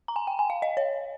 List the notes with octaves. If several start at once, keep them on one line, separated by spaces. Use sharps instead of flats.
A#5
G#5
G5
G#5
F5
D#5
C#5